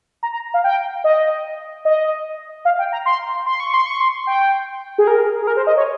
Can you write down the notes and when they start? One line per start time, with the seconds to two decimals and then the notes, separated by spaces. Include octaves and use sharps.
0.23 A#5
0.33 A#5
0.54 F5
0.64 G5
1.04 D#5
1.85 D#5
2.65 F5
2.79 G5
2.92 A#5
3.06 C6
3.46 C6
3.60 C#6
3.74 C6
3.86 C#6
4.01 C6
4.27 G5
4.98 G#4
5.07 A#4
5.42 G#4
5.47 A#4
5.57 C5
5.67 D#5
5.77 C#5